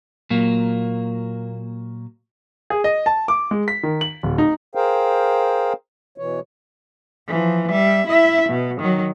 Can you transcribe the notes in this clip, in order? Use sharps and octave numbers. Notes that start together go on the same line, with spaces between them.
A#2 F#3 A#3
G#4
D#5
A5
D6
G#3
B6
D#3
F#7
D1
D#4
G#4 A#4 C5 F5 G5
B2 E3 C#5
E3 F3
G3 E5
E4 E5
B2
D#3 F#3